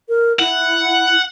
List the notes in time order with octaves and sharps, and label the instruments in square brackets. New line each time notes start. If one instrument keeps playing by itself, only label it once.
[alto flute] A#4
[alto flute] E4 [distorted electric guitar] F#5